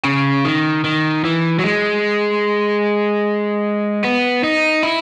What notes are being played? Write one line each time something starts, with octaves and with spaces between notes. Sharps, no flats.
C#3
D#3
D#3
E3
F#3
G#3
B3
D#4
E4